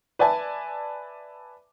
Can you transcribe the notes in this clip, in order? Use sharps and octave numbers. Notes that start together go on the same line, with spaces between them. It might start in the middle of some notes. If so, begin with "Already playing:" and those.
B4 D5 E5 G#5 A5